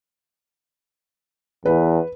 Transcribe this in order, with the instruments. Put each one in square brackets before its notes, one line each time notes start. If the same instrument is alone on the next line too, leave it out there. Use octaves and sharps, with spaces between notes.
[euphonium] E2 [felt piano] B4